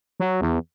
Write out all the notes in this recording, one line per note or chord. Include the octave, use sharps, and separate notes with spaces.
F#3
E2